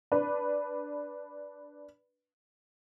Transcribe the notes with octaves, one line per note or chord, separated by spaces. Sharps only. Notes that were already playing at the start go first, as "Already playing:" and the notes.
D4 B4